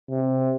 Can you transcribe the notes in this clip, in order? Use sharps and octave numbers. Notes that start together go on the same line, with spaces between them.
C3